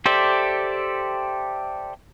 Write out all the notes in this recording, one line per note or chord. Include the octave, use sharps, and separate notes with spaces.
G4 A4 C5 D5 E5